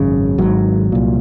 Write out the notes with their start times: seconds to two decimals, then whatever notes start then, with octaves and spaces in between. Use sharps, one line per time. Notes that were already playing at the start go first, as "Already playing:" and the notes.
Already playing: G#1 F#2 C#3
0.38 G#1 G#2 F#3
0.92 C2 A#2